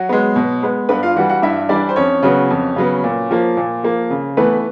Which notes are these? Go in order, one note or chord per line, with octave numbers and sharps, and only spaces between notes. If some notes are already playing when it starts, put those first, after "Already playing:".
Already playing: F#3 F#4
G#3 B3
B2
G#3 B3
G2 B3 B4
F4 F5
E3 G3 F#4 F#5
F#4 F#5
G2 E4 E5
E3 G3 D4 D5
C5
F2 C#4 C#5
C#3 F#3 B3
F2
C#3 F#3 B3
A#2
F3 A#3
A#2
F3 A#3
C#3
E3 A3 B3 B4